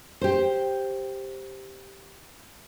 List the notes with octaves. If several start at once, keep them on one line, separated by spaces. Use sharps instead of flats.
G4 C5